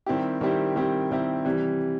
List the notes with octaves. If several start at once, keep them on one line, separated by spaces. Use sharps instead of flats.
D#3 G3 C4 E4 G4
D#3 G3 C4 E4 G4
D#3 G3 C4 E4 G4
D#3 G3 C4 E4 G4
C3 E3 G3